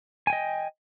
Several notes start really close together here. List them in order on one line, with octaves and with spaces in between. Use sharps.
G#5 G5 D#5